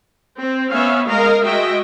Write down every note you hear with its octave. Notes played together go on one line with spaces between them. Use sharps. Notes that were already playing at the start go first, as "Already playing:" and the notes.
C4
B3 C#4 E5 F5
G#3 A#4 D#5 F5
G#3 F#4 D#5 E5 G5